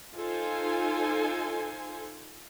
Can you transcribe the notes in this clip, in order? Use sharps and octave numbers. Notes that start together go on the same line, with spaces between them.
D#4 F4 A4 C5 G#5